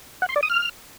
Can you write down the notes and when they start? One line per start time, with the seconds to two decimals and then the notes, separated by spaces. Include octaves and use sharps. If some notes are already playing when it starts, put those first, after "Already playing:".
0.22 F#5
0.29 C6
0.36 D5
0.43 D#6
0.50 F6